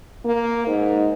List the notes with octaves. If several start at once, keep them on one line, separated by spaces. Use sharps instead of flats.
A#3
G#2